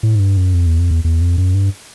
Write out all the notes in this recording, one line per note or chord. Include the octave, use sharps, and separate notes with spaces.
A2
G#2
G2
F#2
F2
E2
F2
E2
E2
F2
F#2
G2